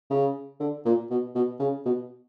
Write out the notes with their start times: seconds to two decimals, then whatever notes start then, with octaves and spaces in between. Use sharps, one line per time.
0.10 C#3
0.60 D3
0.85 A#2
1.10 B2
1.35 B2
1.60 C#3
1.85 B2